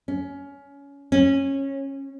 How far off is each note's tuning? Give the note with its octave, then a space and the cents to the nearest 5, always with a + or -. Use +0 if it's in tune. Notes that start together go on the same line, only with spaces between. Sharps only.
C#4 +20
C#4 -20